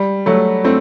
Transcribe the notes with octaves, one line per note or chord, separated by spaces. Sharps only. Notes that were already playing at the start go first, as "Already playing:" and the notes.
Already playing: G3
F#3 A3
A3 C4